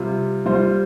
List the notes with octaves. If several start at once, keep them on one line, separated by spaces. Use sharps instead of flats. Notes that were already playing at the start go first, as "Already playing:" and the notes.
Already playing: C3 G3 F4
G3 F4 C5